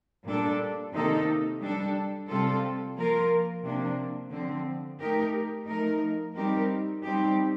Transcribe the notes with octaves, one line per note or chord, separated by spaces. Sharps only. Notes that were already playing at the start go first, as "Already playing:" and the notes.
A#2 G3 D4 A4
C3 D#3 A#3 D#4 A4
G3 D4 A4
C3 G3 C4 F4 A4
F3 A#3 F4 A#4
C3 F3 A#3 D4
D3 F3 C4
A3 D#4 G4 A#4
F3 A3 D#4 A#4
G3 C4 D#4 G4 A#4
G3 C4 D#4 G4